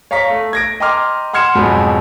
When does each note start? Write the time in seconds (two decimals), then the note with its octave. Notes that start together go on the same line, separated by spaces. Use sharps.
0.11 C#5 F5 A#5 C#6 B6
0.30 A3
0.53 G#6 A#6 D7
0.80 D#5 G5 A#5 C6 D6 F6
1.33 F#5 C6 F6 G#6 C#7 E7
1.55 F2 G#2 B2 F#3 G#5 B5